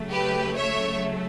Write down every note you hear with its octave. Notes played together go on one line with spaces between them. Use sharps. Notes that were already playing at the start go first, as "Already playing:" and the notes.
Already playing: C#3 F#3 A3
G4 B4
C#5 E5